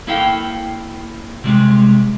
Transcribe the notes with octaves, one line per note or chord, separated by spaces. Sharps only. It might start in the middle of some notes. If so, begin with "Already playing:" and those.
A#3 E4 A4 F5 G5
C3 G3 G#3